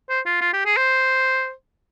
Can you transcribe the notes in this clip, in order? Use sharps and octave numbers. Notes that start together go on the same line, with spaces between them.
C5
F4
F4
G4
G#4
C5